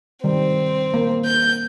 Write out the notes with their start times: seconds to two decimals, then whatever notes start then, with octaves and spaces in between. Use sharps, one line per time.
0.24 D#3 G3 C4
0.94 A#3
1.26 G6